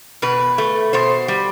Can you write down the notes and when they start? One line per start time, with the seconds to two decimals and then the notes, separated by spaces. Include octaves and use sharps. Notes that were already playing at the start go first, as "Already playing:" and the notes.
0.22 B2 B4
0.58 A3
0.93 B2 C5
1.28 G3